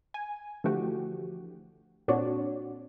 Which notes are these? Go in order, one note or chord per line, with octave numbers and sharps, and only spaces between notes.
G#5
D3 E3 F3 A3 F#4 G4
A#2 C4 D4 F#4 C#5